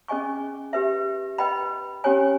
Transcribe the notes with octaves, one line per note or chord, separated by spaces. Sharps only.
C#4 G#4 D#5 G#5 C#6
G4 B4 E5
B4 D#5 G5 B5
C#4 G4 C#5 G#5